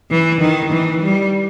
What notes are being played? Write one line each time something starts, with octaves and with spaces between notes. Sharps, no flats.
E3
D#3
E3
G3